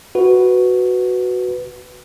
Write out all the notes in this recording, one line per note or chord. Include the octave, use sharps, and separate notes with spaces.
F#4 B4